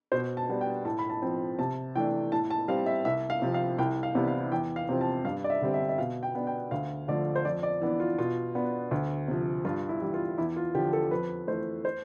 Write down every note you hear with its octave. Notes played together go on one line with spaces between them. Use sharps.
B2 C5
A5
G3 B3 D4
G5
A2 A5
B5
A5
F3 C4
C3 A5
E3 A3 D4 G5
A2 A5
A5
G3 C4 F5
E5
C2 E5
F5
C3 F3 C4
F5
C2 G5
F5
C3 E3 B3 D4
F5
E2 G5
F5
C3 F3 C4
A5
G2 F5
D5
E5
D3 G3 C4
E5
E5
B2 F5
G5
B3 D4
G5
D2 F5
D3 F3 A3 D5
C5
F2 D5
D5
E3 B3 D4
F4
B2 F4
B3 D4
D2
C3 F3
G2 F4
E4
E3 G3
F4
E2 E4
F4
D3 F3 G4
A4
F2 B4
E3 A3 C5
C5